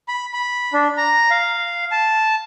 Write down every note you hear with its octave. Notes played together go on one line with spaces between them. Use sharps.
B5
B5
D4
A#5
F5
A5